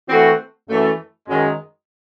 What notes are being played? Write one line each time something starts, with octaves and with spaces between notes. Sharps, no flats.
E3 A3 C4 F#4
F#2 E3 A3
F#2 D#3 G#3